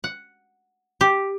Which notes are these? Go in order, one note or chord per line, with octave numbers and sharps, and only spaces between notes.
F#5
G4